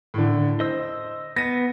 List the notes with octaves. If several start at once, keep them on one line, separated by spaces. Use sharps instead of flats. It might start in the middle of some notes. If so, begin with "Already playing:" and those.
A2 D3
C5 D#5 E6
B3 A#6 D#7